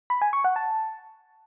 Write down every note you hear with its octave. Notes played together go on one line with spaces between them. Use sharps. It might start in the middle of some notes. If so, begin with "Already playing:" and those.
B5
G#5
C#6
F#5
A5